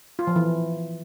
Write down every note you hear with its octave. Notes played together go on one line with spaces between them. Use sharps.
F4
F3
E3